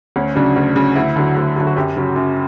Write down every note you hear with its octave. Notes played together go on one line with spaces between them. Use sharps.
D2 C#4
C#3 F#3 D4
D2
C#3 F#3
D2 E4
D3 F#3
D2
D3 F#3
F#4
F#2 G4
C#3 F#3
F#2